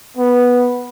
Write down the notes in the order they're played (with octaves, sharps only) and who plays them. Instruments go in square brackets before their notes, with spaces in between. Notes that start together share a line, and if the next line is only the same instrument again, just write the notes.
[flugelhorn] B3